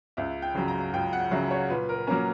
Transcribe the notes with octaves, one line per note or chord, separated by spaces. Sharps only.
C#2 E5
G5
C#3 F#3
A#5
C#2 G5
F#5
C#3 F#3 E5
C#5
A#2 B4
A#4
F#3 A#3 C#4 A#4